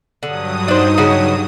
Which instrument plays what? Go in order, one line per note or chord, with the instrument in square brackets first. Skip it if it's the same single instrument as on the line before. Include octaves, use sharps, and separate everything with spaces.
[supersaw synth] G2 F#3 D#6 [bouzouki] D3
[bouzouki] D4 C5 [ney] D#4
[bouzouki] C#3 F#4